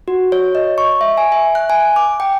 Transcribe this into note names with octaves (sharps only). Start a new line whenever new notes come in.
F#4
C#5
D#5
C#6
E5
G#5
E5
F#6
G#5
D6
G5